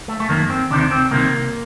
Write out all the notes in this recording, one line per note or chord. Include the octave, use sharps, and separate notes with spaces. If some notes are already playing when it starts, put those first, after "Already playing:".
A3
A3
F#2 D#3 A#3
C4
D2 C3 D#3 D4
D4
C4
C2 C3 D#3 A#3